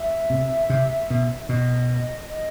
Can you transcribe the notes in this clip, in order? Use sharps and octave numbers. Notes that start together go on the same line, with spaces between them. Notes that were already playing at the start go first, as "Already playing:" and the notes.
Already playing: E5
C3
C3
B2
B2 D#5
D#5